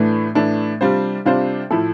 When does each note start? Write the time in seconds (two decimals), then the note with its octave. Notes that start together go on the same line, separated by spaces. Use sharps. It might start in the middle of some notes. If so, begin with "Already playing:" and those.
Already playing: A2 E3 A3 D4
0.35 A2 E3 A3 D4
0.81 C3 G3 D4 F4 C5
1.25 C3 G3 D4 F4 C5
1.70 A2 F3 A3 E4 A4